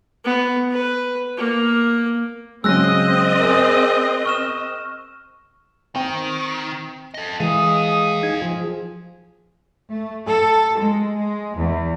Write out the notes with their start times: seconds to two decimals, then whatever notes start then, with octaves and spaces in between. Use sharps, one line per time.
0.24 B3
0.70 B4
1.37 A#3
2.64 C#3 F#3 G#3 C4 D#5 E6 F#6 A#6
3.40 G#4 A#4
4.26 C#6 F6 E7
5.95 D#3 C4 G5
7.14 A4 D#5
7.40 E3 G#3 D#5 F5 D#6
8.23 D#4 G#5
8.42 F3 G#4
9.90 A3
10.26 A4
10.78 G#3
11.17 G#3
11.56 E2